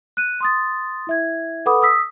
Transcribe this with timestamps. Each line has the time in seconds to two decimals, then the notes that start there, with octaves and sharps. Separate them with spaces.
0.17 F#6 D#7
0.41 C6 D#6 A6
1.07 E4 E5 G#6
1.66 A4 B4 F#5 B5 D6 D#6
1.82 D#6 E6 B6